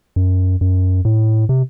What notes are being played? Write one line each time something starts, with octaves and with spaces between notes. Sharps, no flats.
F#2
F#2
A2
C3